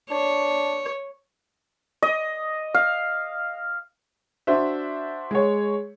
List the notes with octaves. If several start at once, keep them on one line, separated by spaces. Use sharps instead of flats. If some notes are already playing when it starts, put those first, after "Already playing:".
D4 C#5
D#5
F5
D4 F#4 C5 E5
G#3 C#5